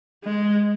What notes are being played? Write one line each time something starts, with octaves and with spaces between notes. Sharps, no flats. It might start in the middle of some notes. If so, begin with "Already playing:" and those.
G#3